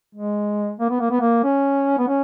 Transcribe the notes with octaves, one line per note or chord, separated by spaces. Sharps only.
G#3
A#3
B3
A#3
B3
A#3
C#4
B3
C#4